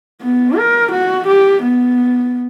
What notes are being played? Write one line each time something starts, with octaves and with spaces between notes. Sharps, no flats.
B3
A#4
F#4
G4
B3